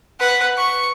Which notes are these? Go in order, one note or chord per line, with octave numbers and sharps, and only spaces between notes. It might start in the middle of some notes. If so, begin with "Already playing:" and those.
B4 F#5
C#6